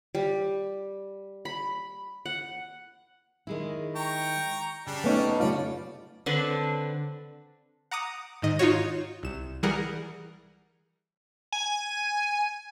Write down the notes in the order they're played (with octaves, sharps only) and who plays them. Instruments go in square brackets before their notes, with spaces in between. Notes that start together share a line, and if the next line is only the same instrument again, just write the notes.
[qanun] G3
B5
F#5
[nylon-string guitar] D#3 G#3 E4
[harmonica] G5 A#5 C#6
[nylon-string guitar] C#3 [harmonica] G3 D4
[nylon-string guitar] A3 [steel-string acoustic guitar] B3 C#4 D#4
[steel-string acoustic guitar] C#3 F4 [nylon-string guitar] G3 A3 C#5 [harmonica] D5
[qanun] D3 C4 D4 B4
[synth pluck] F#5 A#5 D6 D#6
G#2 D#3 D#5
D#4 F4 F#4 C#5
C2 E7
E3 G3 G#4 A#4 F#5
[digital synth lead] G#5